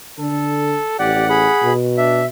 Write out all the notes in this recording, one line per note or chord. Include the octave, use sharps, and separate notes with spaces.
D3 A4
A1 G4 D5 F#5
G#4 B5
B2
D4 E5